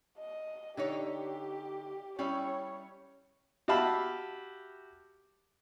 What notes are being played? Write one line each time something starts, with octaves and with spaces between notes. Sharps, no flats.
D#5
D3 D#4 G4 C#5
G3 C#4 E4 C#5
F#4 G4 E5 F5 A5 B5